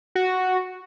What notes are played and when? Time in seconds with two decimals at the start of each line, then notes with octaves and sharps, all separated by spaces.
0.15 F#4